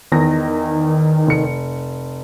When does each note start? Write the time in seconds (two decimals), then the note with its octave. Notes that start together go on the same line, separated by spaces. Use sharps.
0.12 E2 D#3 A#6
1.27 F1 C#7